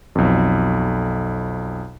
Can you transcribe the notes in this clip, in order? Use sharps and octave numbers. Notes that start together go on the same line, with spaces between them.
B1 F2